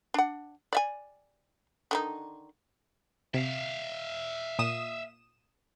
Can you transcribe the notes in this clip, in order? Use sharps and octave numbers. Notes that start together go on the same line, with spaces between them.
D4 F#5
D5 E5 G#5
D3 D#3 D#4
C3 E5 F5
A#2 D#6 E7